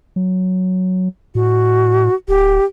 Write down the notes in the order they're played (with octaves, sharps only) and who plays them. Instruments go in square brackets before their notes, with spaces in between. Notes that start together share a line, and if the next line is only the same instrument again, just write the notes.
[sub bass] F#3
[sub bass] A2 [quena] F#4
[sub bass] D1 [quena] G4